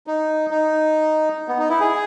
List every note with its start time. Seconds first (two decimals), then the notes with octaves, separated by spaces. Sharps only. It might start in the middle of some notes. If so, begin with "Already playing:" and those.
0.07 D#4
0.51 D#4
1.48 B3
1.59 D#4
1.69 E4
1.80 G#4